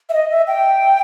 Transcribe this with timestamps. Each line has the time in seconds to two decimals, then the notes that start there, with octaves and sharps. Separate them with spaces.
0.09 E5
0.14 D#5
0.30 E5
0.47 G5